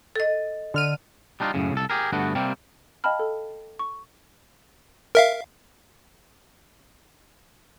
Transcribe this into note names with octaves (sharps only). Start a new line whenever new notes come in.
A4 D#5
D3 F6 D#7
G3 D4 D#4 F4
F#2 A2 C#3
C2 A4
G4 G#4 A#4
G2 D3 A3 B3 F#4
C3 G3 A#3 C4
D#5 F5 G5 A5 B5 F6
A4
C#6
A#4 E5 F5